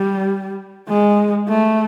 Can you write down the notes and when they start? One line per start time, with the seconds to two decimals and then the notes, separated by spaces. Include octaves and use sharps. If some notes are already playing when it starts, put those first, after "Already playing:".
Already playing: G3
0.89 G#3
1.49 A3